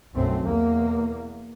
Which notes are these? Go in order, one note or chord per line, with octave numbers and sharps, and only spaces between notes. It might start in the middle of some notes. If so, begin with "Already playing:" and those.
B1 F#2 A3 C4
E2 A#3